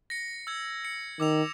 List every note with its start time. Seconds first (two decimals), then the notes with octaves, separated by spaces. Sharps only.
0.10 A#6 C#7
0.47 E6 G#6
0.85 C#7
1.20 D#3 D6 E6 F7